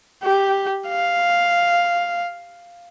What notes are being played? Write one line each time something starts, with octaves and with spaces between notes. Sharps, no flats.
G4
F5